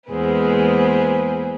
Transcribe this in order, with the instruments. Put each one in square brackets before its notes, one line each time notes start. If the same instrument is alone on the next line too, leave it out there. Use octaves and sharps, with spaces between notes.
[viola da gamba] E2 G#3 A#3 [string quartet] G#4 B4 C5